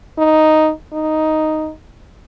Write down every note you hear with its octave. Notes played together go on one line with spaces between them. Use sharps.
D#4
D#4